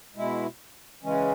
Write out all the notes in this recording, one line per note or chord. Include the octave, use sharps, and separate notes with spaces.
B2 G#3 E4
C#3 E3 G#3 C#4